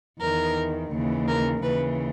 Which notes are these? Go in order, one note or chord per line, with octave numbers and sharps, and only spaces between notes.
E2 D#3 A#4
D#2 C#3 E3
A#4
D#2 C#3 E3 B4